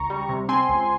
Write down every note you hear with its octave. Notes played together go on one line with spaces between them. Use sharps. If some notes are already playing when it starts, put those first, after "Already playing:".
Already playing: C#2 A#5 C#6
G3
C3
C4 G#5 C6
C#2